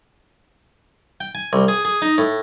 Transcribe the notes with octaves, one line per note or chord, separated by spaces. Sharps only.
G5
G#5
C2
G#4
G#4
D#4
A2